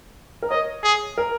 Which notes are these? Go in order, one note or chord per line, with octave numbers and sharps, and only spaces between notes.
A#4
C#5 D#5
G#4
A#4